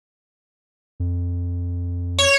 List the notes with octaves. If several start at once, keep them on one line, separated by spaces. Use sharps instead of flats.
F2
C#5